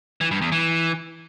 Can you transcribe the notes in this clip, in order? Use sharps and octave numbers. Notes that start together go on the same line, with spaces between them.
E3
G2
E2
E3